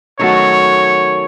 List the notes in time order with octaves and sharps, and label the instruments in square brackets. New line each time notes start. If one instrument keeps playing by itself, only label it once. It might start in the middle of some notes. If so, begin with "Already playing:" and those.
[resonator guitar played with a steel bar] D#3 F#3 A3 C#4 F#4 [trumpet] C#5